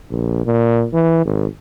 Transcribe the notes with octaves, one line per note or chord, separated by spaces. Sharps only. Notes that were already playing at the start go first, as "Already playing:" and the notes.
A#1
A#2
E3
G#1